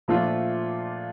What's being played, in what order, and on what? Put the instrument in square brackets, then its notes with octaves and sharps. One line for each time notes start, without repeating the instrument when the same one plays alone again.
[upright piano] A#2 A3 D4 F4 [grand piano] F3